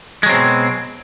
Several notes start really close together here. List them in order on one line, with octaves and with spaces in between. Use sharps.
G#3 F#3 C4 B2